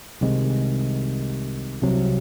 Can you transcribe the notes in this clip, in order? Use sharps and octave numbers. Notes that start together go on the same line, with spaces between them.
C2 C3 D#3 G#3
C2 C3 F#3